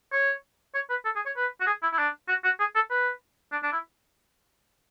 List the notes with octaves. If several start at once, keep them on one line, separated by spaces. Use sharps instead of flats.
C#5
C#5
B4
A4
G#4
C#5
B4
F#4
G#4
E4
E4
D4
F#4
F#4
G#4
A4
B4
D4
D4
E4